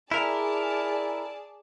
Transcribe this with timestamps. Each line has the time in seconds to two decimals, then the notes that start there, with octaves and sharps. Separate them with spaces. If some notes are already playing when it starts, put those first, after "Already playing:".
0.12 E4 G#4 A#4 D5 A5